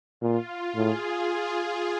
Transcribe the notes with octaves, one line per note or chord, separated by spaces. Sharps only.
A#2 F4
A2 G#4